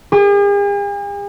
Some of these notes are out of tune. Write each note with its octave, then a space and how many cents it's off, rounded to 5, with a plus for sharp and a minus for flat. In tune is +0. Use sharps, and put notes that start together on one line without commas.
G#4 -45